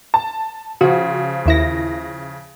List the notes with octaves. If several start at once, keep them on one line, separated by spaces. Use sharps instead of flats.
A5
C#3 F3 F#4
D#2 E4 A#6